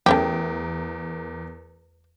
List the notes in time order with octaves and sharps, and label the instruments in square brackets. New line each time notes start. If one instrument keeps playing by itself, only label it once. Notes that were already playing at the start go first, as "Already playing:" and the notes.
[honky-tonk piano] E2 A#4 [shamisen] A3 C#4 G4